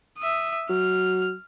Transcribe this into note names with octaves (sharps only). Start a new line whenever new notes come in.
E5 D#6
F#3 F6